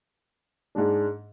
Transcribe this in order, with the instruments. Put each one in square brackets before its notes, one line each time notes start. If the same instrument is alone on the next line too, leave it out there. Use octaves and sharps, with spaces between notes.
[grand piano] G#2 G#3 D4